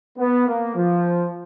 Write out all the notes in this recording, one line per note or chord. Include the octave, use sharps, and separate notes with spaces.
B3
A#3
F3